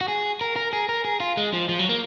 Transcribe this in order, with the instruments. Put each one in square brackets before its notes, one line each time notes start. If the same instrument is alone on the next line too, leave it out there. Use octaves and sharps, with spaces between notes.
[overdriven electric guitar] F#4
G#4
A#4
A#4
G#4
A#4
G#4
F4
G#3
F3
F3
F#3
A#3